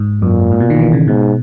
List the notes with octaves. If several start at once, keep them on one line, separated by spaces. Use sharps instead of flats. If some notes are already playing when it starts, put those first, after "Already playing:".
Already playing: G#2
F#2 A#2
G#2
B2
D#3
E3
C#3
G#2 B2